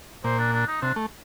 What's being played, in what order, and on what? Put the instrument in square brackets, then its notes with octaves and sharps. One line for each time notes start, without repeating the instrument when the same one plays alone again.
[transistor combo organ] A#2 [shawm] C5
[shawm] D4
D4
D#4
[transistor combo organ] C3 [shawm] D4
[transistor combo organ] A3